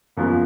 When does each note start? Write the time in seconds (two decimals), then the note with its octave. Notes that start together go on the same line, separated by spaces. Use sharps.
0.17 F#1 F#2 F3 B3 F4